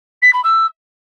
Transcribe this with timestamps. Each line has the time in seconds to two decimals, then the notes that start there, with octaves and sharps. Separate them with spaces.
0.22 B6
0.33 B5
0.44 E6